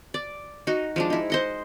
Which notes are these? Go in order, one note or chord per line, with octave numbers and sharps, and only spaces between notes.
D5
D#4 F#4
F3 G#3 D4
D#4 E4
C5 D#5 F#5